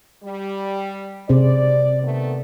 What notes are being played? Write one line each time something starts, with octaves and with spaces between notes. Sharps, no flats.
G3
C3 G#4 C5 D5
D#3 A3 B3